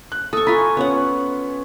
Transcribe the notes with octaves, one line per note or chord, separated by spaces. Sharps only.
F#6
A4 C#6 D#6
F4 G#5 A#5 B5 B6
B3 C#4 F4 C#5 F#5